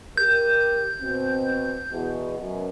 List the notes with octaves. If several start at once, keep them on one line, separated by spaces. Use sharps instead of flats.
G4 A#4 G6
B2 C4
E2 B2
F#2 B2